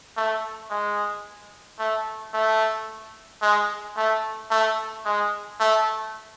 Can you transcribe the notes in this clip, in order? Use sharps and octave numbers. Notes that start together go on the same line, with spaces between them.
A3
G#3
A3
A3
G#3
A3
A3
G#3
A3